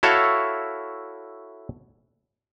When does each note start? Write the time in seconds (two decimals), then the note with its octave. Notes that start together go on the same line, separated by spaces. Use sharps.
0.03 E4 F#4 A4 C#5 E5 F5